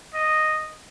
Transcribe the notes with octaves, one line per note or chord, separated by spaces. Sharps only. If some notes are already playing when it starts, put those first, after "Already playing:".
D#5